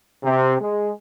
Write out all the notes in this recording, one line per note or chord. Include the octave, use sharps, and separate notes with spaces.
C3
G#3